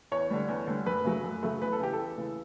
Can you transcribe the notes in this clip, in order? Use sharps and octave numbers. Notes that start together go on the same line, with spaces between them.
E2 C#5
D3 G3
E2
D3 G3
F#2 B4
C#3 F#3 A3
F#2
C#3 F#3 A3
E2 B4
A4
C#3 E3 G4
A4
E2
C#3 E3